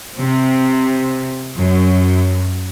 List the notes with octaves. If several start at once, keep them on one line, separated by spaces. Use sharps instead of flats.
C3
F#2